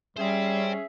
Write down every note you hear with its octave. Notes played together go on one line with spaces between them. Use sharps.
G3 C#4 G#4 C5 E5 G5